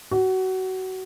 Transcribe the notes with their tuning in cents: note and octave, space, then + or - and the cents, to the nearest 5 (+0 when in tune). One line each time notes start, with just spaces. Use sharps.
F#4 +25